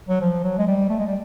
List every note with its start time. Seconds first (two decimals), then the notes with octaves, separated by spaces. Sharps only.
0.09 F#3
0.21 F3
0.43 F#3
0.58 G#3
0.67 G3
0.89 A3
0.99 G#3
1.06 G3